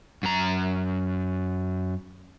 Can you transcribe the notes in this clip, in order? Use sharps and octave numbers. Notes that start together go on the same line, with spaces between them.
F#2 A#5